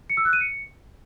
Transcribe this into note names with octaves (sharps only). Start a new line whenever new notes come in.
C#7
E6
F#6
D#7
C#7